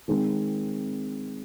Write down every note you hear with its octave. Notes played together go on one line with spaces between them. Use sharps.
D#3 G#3 C4